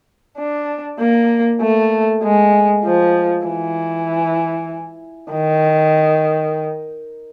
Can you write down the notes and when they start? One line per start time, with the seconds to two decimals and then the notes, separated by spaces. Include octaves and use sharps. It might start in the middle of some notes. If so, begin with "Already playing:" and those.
0.38 D4
1.00 A#3
1.61 A3
2.23 G#3
2.85 F3
3.46 E3
5.32 D#3